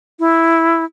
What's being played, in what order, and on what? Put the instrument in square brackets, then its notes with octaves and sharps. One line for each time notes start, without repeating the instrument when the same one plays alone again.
[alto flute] E4